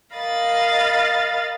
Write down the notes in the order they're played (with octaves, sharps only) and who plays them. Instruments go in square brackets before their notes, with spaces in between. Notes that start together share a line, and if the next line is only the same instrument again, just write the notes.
[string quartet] A#4 D#5 F5 B5 A6